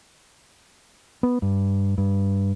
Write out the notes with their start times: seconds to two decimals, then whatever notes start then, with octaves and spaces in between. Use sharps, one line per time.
1.23 B3
1.42 G2
1.98 G2